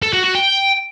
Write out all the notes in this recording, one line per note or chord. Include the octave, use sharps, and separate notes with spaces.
A4
F#4
F#4
G5